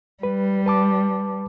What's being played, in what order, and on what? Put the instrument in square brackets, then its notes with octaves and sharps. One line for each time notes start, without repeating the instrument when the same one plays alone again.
[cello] G3 [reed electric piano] B4
[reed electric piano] B4 A5 D6